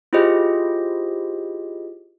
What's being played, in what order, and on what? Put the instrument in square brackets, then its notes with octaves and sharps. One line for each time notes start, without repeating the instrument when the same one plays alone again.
[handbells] E4 F4 G4 G#4 C5 D#5